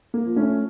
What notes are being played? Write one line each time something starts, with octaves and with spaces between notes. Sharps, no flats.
A#3
F3
A3 C#4